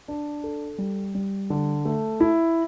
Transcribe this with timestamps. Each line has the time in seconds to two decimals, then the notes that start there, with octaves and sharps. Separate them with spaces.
0.08 D4
0.44 A4
0.78 G3
1.15 G3
1.50 D3
1.85 A3
2.20 E4